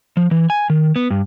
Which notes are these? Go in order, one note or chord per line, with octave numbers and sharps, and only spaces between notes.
F3
E3
G#5
D#3
B3
G2